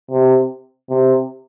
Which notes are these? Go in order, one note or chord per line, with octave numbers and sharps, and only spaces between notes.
C3
C3